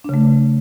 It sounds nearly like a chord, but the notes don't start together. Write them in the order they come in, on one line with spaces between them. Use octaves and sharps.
D4 C#3 A3